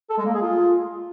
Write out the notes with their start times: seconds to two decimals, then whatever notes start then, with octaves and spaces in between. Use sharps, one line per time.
0.10 A4
0.18 G#3
0.26 A#3
0.34 G#4
0.42 F4